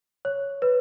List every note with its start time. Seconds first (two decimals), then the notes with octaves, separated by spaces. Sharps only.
0.25 C#5
0.62 B4